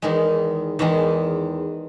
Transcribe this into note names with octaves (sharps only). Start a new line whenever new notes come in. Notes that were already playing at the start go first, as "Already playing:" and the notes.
E2 D#3 G#3
E2 D#3 G#3